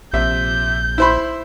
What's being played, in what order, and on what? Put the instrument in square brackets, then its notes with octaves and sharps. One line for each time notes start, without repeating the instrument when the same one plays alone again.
[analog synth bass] A#1 [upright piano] C3 C4 E5 [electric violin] G6
[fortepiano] E4 C5 B5 [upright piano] E5 C6